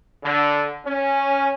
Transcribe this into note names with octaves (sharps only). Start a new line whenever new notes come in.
D3
C#4